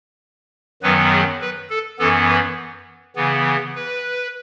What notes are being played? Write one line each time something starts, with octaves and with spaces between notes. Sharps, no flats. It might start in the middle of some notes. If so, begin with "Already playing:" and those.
F#2 D#3 F#3 B3 B4
G#4
B4
A4
F#2 E3 B3 A4
B4
C#3 E3 B3
B4